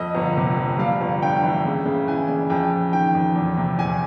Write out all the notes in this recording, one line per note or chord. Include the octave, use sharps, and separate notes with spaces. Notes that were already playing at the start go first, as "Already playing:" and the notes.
Already playing: F2 D#5
G1
C3
F2
G3 F5
G1
G2 G5
E3
C#3
C#3
E3 G#5
C#3
F2 G5
F2
D#3 G5
F2
E2
C3
E2 G#5